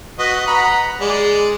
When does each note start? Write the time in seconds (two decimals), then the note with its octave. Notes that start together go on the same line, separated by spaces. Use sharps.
0.19 F#4 B4 D#5
0.47 F#5 A#5 B5
1.01 G#3 D5